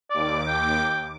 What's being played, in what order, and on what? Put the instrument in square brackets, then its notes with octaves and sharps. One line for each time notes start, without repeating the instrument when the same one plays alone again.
[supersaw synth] D#2 D6 [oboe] D5
[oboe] G5